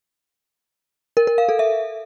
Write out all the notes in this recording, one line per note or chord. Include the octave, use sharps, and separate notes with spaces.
A#4
A#4
F5
A4
E5